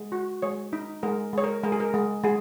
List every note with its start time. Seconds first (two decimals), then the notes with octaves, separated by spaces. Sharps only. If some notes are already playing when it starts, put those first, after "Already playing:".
Already playing: G#3
0.12 F#4
0.42 G#3 C#5
0.73 D#4
1.03 G#3 A#4
1.33 G#3 C#5
1.44 A#4
1.63 G#3 A#4
1.72 G#4
1.80 A#4
1.94 G#3
2.23 G#3 G#4